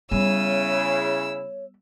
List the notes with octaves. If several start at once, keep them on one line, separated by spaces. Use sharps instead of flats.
C#3 G3 B3 E4 C#5 E6